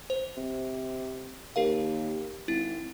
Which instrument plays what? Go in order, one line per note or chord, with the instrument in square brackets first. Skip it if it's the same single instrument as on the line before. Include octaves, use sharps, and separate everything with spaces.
[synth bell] C5
[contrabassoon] C3
[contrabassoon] D#2 [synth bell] G4 A#4 F5
[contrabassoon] G#1 [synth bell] E4